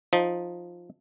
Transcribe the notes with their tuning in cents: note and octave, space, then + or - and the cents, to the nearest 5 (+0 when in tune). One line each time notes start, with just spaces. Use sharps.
F3 +5 D#4 +0